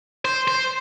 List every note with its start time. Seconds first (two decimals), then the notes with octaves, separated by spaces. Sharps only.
0.25 C5
0.48 C5